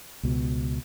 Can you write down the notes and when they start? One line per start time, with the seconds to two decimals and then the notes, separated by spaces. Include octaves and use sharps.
0.23 C#2 B2